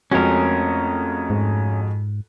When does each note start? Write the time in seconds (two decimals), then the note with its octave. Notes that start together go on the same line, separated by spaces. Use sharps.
0.11 F2 G#3 A3 C4 C#4 F#4 A4 A#4
1.30 G#2